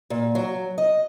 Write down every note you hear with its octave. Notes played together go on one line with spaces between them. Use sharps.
A#2
F#3
D#5